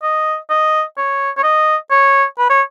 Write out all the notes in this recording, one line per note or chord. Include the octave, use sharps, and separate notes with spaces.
D#5
D#5
C#5
C#5
D#5
C#5
B4
C#5